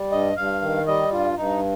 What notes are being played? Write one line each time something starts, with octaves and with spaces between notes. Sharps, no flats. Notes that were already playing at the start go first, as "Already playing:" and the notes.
Already playing: G3
G2 D#5
G2 F5
D#3
G3 D#5
G2 F4
G2 D#4